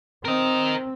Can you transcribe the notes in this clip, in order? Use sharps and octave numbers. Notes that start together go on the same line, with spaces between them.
C4 A#4 D#5